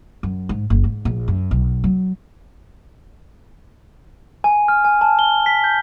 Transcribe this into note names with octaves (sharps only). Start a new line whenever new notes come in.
F#2
G#2
F#1
G#2
A#1
F#2
B1
F#3
G#5
F6
G#5
A5
G7
B6
G6